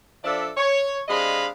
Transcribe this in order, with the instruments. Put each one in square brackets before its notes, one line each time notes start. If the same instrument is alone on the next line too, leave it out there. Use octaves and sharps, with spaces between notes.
[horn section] F3 D4 A4 D5 E5
C#5
C3 G#3 D4 D#5 F5 B5